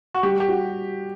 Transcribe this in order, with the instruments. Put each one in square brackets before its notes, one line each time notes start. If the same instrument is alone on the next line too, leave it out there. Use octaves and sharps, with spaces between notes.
[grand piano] F#4
[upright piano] G3 [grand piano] G4
[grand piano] G4
[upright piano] F#4